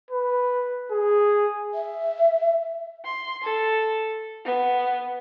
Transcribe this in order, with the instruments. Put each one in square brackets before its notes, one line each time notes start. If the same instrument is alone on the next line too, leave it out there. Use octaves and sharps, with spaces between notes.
[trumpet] B4
G#4
[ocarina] E5
[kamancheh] C6
A4
B3